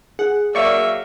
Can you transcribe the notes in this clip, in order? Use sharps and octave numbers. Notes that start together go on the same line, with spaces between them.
G#4 F#5
F#3 A#3 D5 E5 C#6